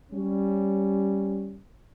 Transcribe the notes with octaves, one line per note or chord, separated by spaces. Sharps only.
G3 C#4